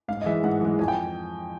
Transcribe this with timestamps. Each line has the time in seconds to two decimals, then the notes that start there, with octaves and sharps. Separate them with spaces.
0.08 G#2 F5
0.22 D#5
0.26 E3 G#3 E5
0.43 G#2 F#5
0.61 E3 G#3
0.79 F2 G#5
0.88 G5